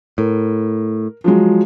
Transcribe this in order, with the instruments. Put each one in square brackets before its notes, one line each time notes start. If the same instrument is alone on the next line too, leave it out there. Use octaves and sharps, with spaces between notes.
[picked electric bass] A2 [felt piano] A#4
[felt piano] F3 F#3 G#3